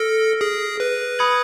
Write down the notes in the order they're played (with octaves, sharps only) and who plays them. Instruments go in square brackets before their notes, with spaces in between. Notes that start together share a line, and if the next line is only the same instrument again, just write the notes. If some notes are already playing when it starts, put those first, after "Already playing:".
Already playing: [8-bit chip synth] A4 [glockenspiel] F6 A#6 D7
[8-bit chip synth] G#4
B4
[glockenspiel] B5 D#6 G#6 C#7 F#7